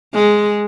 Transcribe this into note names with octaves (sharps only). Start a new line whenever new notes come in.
G#3